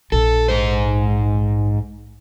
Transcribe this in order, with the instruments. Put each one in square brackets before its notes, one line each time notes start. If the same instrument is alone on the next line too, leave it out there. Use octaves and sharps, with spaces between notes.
[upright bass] A#1 [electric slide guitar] A4
[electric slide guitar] G#2 C5